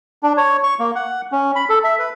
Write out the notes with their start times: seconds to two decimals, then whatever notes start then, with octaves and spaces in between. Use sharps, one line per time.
0.23 D4
0.37 C#5
0.63 C#6
0.80 A#3
0.95 F#5
1.32 C#4
1.55 B5
1.69 A4
1.84 E5
1.99 B4